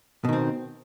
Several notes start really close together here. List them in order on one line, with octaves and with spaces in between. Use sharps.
B2 D#3 C4